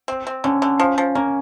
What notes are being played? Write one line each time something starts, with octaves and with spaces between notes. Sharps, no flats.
C4
C4
D3 C#4
D3
F3
F3
A#3 C#4